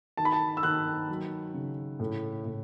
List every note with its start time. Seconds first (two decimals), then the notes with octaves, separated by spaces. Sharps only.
0.17 D#3 A5
0.25 B5
0.32 A5
0.57 E6
0.63 D#3 F#6
1.09 F#3
1.54 C#3
2.00 A2
2.45 A2